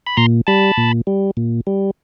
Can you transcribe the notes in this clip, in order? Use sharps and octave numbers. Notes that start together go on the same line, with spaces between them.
B5
A#2 A#5 C6
G3 A5 B5
A#2
G3
A#2
G3